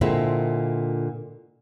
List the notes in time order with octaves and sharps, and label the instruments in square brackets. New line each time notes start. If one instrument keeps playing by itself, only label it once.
[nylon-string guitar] A#2 D3 G#3 C4 E4